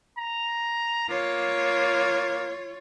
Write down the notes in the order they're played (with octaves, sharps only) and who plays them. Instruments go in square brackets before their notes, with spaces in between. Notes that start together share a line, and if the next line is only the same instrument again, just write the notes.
[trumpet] A#5
[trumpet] A#3 [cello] F4 C#5